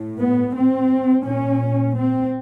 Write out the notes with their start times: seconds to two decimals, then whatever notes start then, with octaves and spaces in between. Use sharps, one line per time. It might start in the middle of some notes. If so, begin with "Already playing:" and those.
Already playing: A2
0.19 B3
0.54 C4
1.23 A#2 C#4
1.94 C4